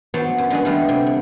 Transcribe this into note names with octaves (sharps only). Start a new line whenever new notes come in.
F#3 B3 C5 A5
F#2
D3 G#3 B3
G3 A3 F4 B4
C3
B3